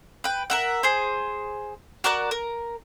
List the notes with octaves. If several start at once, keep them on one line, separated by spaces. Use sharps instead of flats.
B4 G5
A#4 E5 F#5
G#4 C5
F#4 A#4 D5 F#6
A#4